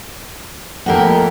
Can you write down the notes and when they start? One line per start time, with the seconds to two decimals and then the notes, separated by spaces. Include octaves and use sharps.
0.86 F2 A3 A#3 G4 A#4 F#5